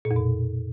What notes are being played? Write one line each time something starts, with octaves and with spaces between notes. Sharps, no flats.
A#2
F2
B2